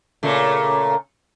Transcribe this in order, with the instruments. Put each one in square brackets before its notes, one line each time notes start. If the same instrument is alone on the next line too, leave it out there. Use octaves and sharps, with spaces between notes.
[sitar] A#2 C#3 A3